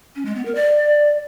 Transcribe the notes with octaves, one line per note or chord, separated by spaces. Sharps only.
C#4
G#3
B3
A#4
D5